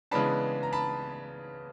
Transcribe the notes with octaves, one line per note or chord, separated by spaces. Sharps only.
C#3 E3 G#3 B3 D4 A5 B5
A#5
A5 B5